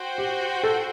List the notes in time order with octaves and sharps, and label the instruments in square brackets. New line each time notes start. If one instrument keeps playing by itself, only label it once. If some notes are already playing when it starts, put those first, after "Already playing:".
Already playing: [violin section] F#4 C5 G5
[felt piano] G4
A4